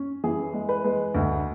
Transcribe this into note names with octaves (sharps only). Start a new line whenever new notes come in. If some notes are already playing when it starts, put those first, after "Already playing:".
Already playing: C#4
E3 G#4
G#3
B4
G#3
D2